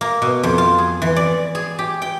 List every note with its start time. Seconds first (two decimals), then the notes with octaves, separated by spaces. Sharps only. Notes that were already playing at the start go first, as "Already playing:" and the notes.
0.01 A#3
0.22 B2
0.43 F2
0.58 F4
0.78 G#4
1.02 E3
1.16 D5
1.55 G#4
1.79 G4
2.02 G5